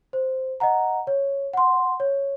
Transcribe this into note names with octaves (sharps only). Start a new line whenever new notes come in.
C5
D#5 F#5 A#5
C#5
F#5 C6
C#5